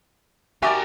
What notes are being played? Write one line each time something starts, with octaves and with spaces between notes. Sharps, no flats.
F#4 G4 A#4 D5 E5 G#5 A5